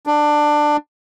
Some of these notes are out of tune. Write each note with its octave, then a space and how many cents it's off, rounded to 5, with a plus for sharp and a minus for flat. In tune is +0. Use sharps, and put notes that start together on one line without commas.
D4 +15